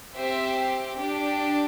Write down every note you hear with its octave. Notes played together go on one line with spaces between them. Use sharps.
C4 G4 C5 E5
D4 G4